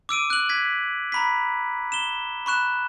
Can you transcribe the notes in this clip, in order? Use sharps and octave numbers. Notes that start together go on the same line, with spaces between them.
D6 E6 D7 D#7
F#6 F#7
G#6 B6
A#5 B5 B6
E7 G7
B5 C#6 F#6 E7